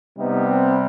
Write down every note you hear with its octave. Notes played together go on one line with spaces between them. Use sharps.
C3 G3 B3 D#4
C4